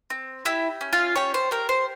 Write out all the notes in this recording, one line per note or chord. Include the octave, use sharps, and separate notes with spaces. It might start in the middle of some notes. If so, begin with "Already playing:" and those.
C4
E4 G4 E5
C#4
F4 F5
C#4 G4 C#5
C5
G4 A#4
C5